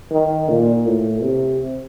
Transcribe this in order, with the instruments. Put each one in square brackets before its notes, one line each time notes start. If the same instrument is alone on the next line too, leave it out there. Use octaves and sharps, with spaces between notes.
[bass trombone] D#3
A#2
A2
C3